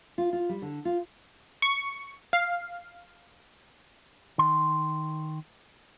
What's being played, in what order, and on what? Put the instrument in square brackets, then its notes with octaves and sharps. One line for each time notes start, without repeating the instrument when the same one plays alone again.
[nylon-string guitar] F4
F4
G3
D3
F4
[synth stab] C#6
F5
[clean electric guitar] D#3 C6